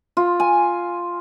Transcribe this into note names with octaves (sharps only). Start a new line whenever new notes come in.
F4
G#5